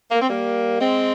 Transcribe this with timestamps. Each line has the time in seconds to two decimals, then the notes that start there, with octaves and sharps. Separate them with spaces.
0.11 A#3
0.20 C4
0.30 G3 A#3
0.81 G#3 C4